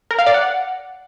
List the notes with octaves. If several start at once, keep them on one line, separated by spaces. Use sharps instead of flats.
A#4
F5
D5
F#5